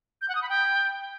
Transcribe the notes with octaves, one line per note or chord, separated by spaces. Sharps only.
G6
F#5
D#6
B5
G5